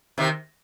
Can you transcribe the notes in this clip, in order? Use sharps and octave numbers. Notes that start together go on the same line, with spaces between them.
C3 D#3